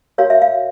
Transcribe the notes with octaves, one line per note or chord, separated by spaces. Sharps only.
F#4 A#4 C#5 F5
E5
F5